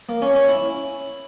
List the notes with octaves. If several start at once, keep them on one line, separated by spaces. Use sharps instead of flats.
A#3
C#4
C#4
E4